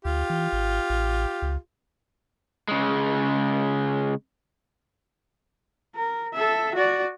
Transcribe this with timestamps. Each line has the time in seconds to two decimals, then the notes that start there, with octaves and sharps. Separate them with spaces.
0.05 D2 F4 G4
0.30 E3
0.53 G#1
0.90 A1
1.42 C#2
2.68 C#3 G#3
5.96 A#4
6.34 A4 E5
6.75 F#4 D5